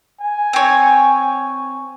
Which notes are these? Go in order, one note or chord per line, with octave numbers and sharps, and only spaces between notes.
G#5
C4 C#5